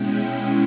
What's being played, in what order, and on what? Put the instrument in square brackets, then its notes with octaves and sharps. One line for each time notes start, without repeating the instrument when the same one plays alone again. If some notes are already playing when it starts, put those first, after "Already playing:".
Already playing: [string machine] B2 G#3 C#4 E4 G5